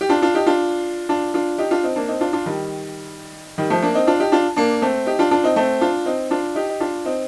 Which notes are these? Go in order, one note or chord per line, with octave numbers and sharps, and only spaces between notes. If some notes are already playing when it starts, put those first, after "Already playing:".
G4
D4 F4
D4 F4
D#4 G4
D4 F4
D4 F4
D4 F4
D#4 G4
D4 F4
C4 D#4
A#3 D4
C4 D#4
D4 F4
D4 F4
D#3 G3
D#3 G3
F3 A3
A#3 D4
C4 D#4
D4 F4
D#4 G4
D4 F4
A#3 D4
A3 C4
D#4 G4
D4 F4
D4 F4
C4 D#4
A3 C4
D4 F4
C4 D#4
D4 F4
D#4 G4
D#4
D4 F4
C4 D#4